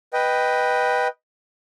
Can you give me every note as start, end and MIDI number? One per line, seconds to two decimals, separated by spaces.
0.13 1.08 71
0.13 1.08 75
0.13 1.08 79